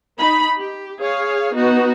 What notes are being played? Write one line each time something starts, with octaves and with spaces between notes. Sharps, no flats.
D#4 B5
G4
G#4 C#5 F5
B3 D#4 F#4